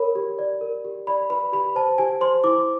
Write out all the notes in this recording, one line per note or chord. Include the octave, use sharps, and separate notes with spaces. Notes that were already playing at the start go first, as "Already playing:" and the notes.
Already playing: A#4 C#5 B5
G4
D5
A#4
G4
D5 B5
B4 B5
G4 B5
C5 A5
G4 G#5
C5 C6
E4 D6